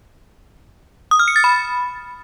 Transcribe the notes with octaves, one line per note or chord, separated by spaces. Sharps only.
D#6
F6
C#7
A6
B5